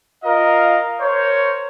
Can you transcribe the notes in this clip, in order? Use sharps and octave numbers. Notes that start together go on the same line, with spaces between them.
F4 A#4 D#5 F5
A#4 C5 C#5